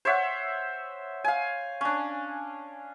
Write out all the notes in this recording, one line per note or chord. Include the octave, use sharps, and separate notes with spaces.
C5 C#5 E5 F#5
F5 G#5
C#4 D4